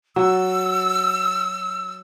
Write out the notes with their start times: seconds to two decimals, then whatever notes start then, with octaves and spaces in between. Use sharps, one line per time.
0.16 F#3 E6